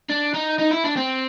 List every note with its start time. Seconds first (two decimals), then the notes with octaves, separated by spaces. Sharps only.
0.09 D4
0.34 D#4
0.59 D#4
0.71 E4
0.84 D4
0.97 C4